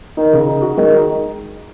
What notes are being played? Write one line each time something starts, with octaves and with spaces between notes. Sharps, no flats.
D#3 D#4
C#3
D#4
F#4
D#3 G#3
D#4